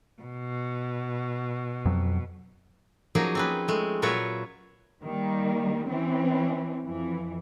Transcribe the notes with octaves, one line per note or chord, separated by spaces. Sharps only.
B2
F2 F#3
F3 F#3 A#3 C#4 D#4 G#4
C4 C#4 B4
G#3 A3
A#2 F#3 F4 B4 C#5 E5
D#3 G3 A#3
E3 C4 C#4
F2 E3